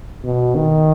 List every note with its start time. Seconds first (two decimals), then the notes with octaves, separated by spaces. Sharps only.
0.24 B2
0.55 D#3